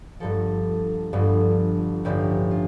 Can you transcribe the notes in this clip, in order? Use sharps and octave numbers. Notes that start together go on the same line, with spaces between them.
G1 G2 F3 A4
G1 G2 F3
A1 G2 D3 F3 G4
F4